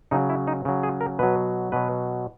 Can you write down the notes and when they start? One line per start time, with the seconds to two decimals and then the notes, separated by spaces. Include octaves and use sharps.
0.11 C#3 F#3 D#4
0.30 E4
0.47 D#4
0.65 C#3 F#3
0.83 G#4
1.01 A#4
1.19 B2 F#3 B4
1.72 B2 F#3 B4